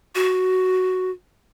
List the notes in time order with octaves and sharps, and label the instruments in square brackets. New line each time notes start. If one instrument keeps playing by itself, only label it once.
[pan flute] F#4